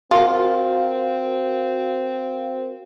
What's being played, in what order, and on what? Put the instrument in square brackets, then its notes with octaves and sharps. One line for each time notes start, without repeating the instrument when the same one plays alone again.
[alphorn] C4 [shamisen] F4 [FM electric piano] F#4 A#4 F5